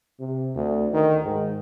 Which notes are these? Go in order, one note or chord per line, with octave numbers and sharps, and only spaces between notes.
C3
D2
D#3
G#2